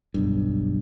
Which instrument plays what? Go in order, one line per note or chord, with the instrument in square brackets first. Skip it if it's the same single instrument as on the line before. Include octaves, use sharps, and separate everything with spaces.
[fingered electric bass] F#1 B1 G2